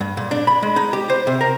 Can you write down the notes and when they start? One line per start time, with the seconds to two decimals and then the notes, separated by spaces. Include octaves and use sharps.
0.01 G2
0.17 A#2
0.31 D4
0.47 B5
0.63 G#3
0.76 D#4
0.93 G4
1.10 C5
1.27 C3
1.41 A#4